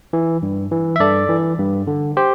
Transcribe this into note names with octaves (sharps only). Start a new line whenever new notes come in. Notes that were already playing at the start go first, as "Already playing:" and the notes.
E3
G2
E3
E5
G2 A4 D5
E3
G2
D3
G4 C5